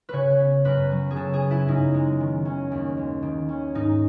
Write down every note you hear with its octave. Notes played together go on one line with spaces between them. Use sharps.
C#3 B4 C#5
B3
F#2 B4
F#3
G#4
C#3 A4
G#4
B3
E4
F#2 D#4
G#3
D#3
C#4
D#2
G#3
D#3
C#4
G#2 D#4